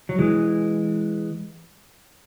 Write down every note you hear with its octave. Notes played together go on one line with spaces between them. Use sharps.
F#3
E3 G#3